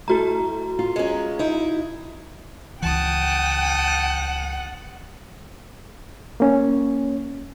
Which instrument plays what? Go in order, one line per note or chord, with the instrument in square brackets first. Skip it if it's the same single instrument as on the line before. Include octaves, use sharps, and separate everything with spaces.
[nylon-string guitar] A3 E4 A4 [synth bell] F#4 A#5
[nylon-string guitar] F4
[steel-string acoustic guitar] G#3 C#4
D#4 E4
[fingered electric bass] C#2 E3 [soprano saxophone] F#5 [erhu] G5 [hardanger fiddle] A5 D#6
[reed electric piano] A#3 C#4 C#5